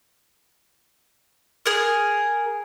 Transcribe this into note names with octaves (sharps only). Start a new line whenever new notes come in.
G#4 A#4